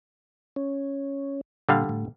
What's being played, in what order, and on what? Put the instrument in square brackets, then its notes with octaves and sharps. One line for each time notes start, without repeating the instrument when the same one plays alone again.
[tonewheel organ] C#4
[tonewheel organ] A#2 [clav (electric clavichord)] D3 G3 F5
[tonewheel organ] A2